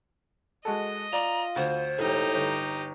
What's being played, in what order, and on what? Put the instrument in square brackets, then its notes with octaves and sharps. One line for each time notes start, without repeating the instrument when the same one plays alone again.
[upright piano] G#3 F#4 A4 [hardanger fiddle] D#5
[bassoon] F4 [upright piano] D5 [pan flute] A#5
[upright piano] D2 [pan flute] C5
[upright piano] E1 [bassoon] A2 [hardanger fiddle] D#4 G4
[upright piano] G1